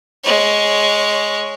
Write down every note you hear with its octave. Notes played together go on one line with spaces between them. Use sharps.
G#3 C#5